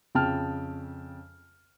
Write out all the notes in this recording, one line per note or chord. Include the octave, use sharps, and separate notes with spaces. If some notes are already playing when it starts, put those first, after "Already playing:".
F2 C#3 G5 A5 F6